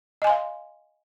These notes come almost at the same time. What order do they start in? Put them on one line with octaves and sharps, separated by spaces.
D#5 G#5 C6 F5